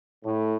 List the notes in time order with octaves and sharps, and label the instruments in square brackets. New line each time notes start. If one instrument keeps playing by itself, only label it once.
[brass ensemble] A2